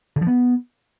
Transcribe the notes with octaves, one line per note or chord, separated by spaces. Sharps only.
D3
F3
B3